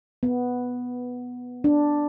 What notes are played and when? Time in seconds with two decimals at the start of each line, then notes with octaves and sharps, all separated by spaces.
0.23 B3
1.64 D4